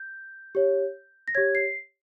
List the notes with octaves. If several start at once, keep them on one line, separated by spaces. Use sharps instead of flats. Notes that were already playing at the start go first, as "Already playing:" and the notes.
Already playing: G6
G4 C#5
A#6
G4 C#5 G#6
C7